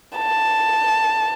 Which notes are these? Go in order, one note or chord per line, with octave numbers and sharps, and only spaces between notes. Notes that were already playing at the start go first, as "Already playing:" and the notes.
A5